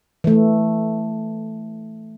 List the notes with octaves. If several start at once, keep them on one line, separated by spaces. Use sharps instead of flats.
E3 A3